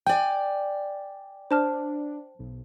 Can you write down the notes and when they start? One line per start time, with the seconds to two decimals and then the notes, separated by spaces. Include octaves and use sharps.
0.07 D5 G5 G#5
1.51 D4 C5 A5 F6
2.39 B1